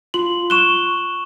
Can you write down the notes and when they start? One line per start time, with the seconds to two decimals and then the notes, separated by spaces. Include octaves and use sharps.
0.14 F4 C6 F#7
0.50 C#6 F#6 E7 G7